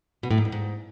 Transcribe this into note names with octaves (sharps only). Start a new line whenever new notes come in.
B2
A2
G#2
F2
G#2